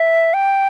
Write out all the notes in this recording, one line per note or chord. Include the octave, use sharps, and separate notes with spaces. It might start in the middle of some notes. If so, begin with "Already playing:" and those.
Already playing: E5
G5